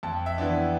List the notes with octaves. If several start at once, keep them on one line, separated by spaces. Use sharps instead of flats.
F2 A5
E5
E3 B3 D4